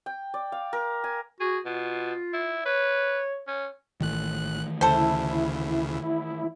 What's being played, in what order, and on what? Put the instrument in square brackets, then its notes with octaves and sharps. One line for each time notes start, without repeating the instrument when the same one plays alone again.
[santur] G5
D5
F5
A#4
G#5
[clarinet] F#4 [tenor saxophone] G#4
[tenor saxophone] B2 [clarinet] F4
[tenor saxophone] E4
[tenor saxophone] B4 [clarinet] C#5
[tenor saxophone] C#4
[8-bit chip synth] A1 F#6 [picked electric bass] D#3 E3 A3
[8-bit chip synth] D2 C#3 [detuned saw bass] E4 [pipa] A4 C5